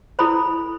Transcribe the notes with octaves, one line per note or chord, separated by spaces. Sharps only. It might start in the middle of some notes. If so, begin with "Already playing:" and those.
E4 A4 C5 B5